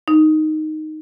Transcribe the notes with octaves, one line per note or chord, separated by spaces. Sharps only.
D#4